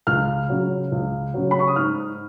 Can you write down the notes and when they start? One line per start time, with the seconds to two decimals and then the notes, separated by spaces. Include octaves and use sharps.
0.07 C#2 F6
0.49 C#3 F#3
0.92 C#2
1.34 C#3 F#3
1.51 B5
1.59 C#6
1.68 D#6
1.76 G#2 F6